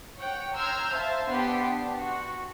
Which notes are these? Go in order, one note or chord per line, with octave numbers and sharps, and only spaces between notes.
C#5 F#5 G5
A#5 C6 E6 F6 G6 G#6
C5 E5 F5 A5
B3 D4 G4 C6
D4
F#4